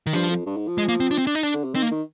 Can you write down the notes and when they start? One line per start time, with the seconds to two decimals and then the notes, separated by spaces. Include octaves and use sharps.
0.07 D#3
0.13 G2 F3
0.30 F2
0.46 G2
0.57 G#2
0.67 F3
0.78 G#3
0.89 A#3
1.00 C4
1.11 D4
1.18 C4
1.27 D4
1.35 D#4
1.43 D4
1.54 D3
1.64 C3
1.74 D#3 C4
1.82 A#3
1.91 D#3